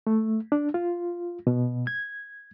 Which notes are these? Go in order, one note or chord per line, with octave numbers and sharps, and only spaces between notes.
A3
D4
F4
B2
G#6